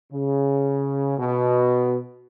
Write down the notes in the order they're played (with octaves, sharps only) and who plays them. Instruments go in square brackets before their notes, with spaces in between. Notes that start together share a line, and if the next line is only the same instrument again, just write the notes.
[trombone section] C#3
B2